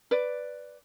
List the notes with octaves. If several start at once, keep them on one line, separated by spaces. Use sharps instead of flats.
B4 D5